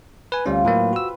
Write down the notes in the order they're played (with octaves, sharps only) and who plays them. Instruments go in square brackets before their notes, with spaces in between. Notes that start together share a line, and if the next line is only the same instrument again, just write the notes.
[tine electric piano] B4 G#5
[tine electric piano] D2 G3 C#4 [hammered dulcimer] C3 F4
[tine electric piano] A2 F#3 A#3 [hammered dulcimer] B4
[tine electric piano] F#4 E6